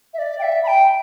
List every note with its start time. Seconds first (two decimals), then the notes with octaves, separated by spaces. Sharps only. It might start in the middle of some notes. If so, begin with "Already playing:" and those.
0.13 E5
0.18 D5
0.39 G5
0.42 E5
0.63 B5
0.67 G5